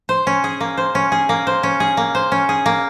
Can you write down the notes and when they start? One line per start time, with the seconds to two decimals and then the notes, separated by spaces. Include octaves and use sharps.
0.09 C5
0.27 C#4
0.44 G#4
0.61 A#3
0.77 C5
0.95 C#4
1.12 G#4
1.29 A#3
1.47 C5
1.63 C#4
1.80 G#4
1.97 A#3
2.15 C5
2.32 C#4
2.49 G#4
2.66 A#3